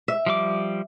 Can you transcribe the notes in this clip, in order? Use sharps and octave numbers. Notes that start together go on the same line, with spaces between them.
E5
F3 G3 D6